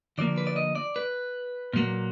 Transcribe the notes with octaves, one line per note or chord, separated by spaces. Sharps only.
D3 F3 A#3 D5
B4
D5
D#5
D5
B4
A#2 F#3 A#3